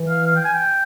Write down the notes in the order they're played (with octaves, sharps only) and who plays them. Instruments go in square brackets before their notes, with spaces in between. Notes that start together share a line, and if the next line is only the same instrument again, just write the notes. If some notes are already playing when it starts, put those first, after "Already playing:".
Already playing: [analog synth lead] E3
[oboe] F5
F5
G5
G#5
G5